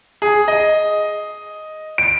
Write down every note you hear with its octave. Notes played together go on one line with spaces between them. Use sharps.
G#4
D#5
D7